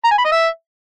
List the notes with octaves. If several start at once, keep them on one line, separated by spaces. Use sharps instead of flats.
A#5
G#5
B5
D#5
E5